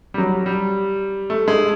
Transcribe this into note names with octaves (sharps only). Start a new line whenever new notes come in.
G3
F#3
G3
A3
G#3